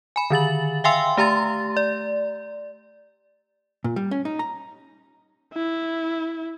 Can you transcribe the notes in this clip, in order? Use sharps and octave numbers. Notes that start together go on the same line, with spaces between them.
G#5 B5
D3 D#3 A6 F#7
E5 F5 G5 G#5 C6 E6
A3 G4 A#5 C6 A6
D5
A#2
G3
C#4
D#4
A#5
E4